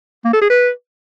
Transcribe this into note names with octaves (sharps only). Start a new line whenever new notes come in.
A#3
A4
G#4
B4